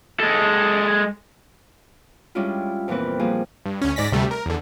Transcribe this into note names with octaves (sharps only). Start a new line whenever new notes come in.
G#3 A4
G3 G#3 C#4 D4 E4 F4
F2 A#2 E3 B3 C4 B4
F3 G3 A#3 G#4
G2
D2 C#4
G#2 D5 A#6 B6
D2 C3 G3 A3
A#4
E2 D3